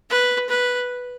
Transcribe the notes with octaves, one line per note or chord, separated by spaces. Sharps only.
B4
B4